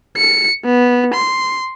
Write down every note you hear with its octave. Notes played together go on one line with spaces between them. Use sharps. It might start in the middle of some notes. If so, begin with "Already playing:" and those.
C#7
B3
C6